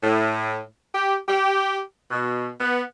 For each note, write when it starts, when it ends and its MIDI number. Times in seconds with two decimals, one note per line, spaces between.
0.03 0.60 45
0.93 1.15 67
1.27 1.77 67
2.10 2.48 47
2.61 2.81 59